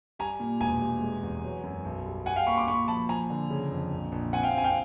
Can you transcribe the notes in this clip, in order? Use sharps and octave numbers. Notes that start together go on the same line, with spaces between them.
G3 G#5 A#5
A#2
E1 G#5 A#5
G3
G#3
E2
F#3
F#2
B1
G3
G3 F#5 G#5
F5 G5
A#3 B5 C#6
C6 D6
A#2 B5 C#6
F3 A5 B5
F3 G#5 A#5
D3
C#3
F2
A#1
A#1
C4 F#5 G#5
F5 G5
C4 G#5
F5 G5